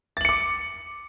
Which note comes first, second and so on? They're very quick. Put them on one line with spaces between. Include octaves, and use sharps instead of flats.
A6 F#7 C#7 D6